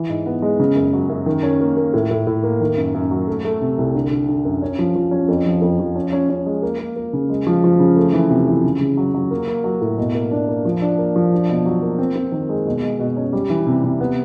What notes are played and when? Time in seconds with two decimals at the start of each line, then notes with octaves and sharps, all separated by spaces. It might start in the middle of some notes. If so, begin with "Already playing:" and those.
Already playing: E3
0.09 G#2
0.26 B3
0.42 G#3
0.59 C#3
0.76 F#2
0.93 F#3
1.09 F#2
1.26 D#3
1.43 C#4
1.60 A#3
1.77 A#3
1.94 A2
2.11 A2
2.27 A2
2.43 A#3
2.60 D#3
2.77 F#2
2.94 F#2
3.11 F#3
3.28 A3
3.45 A3
3.61 C3
3.78 C2
3.95 D3
4.11 D3
4.28 D3
4.45 F#2
4.62 C#4
4.79 F3
4.95 F3
5.11 C#4
5.28 F2
5.46 F3
5.62 F2
5.80 F3
5.95 C#4
6.12 C#4
6.29 C#4
6.46 G#3
6.62 A#3
6.79 A#3
6.96 A#3
7.13 C#3
7.30 G#3
7.47 F3
7.64 F3
7.79 C#3
7.97 A3
8.13 E3
8.30 C3
8.47 E3
8.64 C#3
8.81 C#3
8.97 F#3
9.14 F#3
9.31 A#3
9.48 A#3
9.64 F#3
9.81 A2
9.98 B2
10.15 A#3
10.31 D4
10.48 A#3
10.65 F3
10.82 D4
10.98 A#3
11.16 F3
11.33 D4
11.49 B2
11.66 F#3
11.82 A#3
11.99 C4
12.16 C4
12.32 D#3
12.49 G#3
12.66 B2
12.83 G#3
12.99 B2
13.17 C#4
13.33 G3
13.50 E3
13.67 C3
13.84 C3
14.01 B3